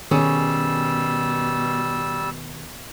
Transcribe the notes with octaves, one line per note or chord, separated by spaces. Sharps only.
B2 D#3 G3 C#4 G#4 E6